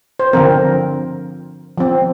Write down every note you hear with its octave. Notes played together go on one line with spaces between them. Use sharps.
C5
D3 F3 C4 A#4
F3 C4